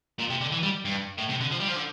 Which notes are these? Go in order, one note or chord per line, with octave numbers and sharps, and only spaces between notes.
A#2
C3
D3
E3
G3
G2
A2
C3
D3
F3
G3
F3
D3